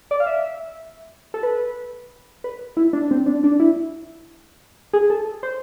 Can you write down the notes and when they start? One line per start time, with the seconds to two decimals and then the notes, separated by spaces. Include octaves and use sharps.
0.11 D5
0.20 F5
0.26 E5
1.34 A4
1.43 B4
2.44 B4
2.77 E4
2.93 D4
3.11 C4
3.26 D4
3.44 D4
3.60 E4
4.93 G#4
5.10 A4
5.43 C5